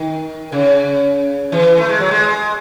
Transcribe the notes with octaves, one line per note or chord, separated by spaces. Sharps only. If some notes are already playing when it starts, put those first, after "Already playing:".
Already playing: D#3
C#3
E3
A3
G#3
F#3
G#3